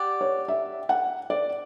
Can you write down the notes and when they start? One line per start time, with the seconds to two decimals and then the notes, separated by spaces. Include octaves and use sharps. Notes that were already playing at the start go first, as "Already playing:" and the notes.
Already playing: G4 D5 F#5
0.21 C#5
0.48 E5
0.89 F#5
1.30 D5